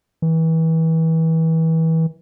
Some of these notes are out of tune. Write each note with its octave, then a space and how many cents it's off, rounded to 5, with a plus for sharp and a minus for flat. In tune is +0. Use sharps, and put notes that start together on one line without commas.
E3 -30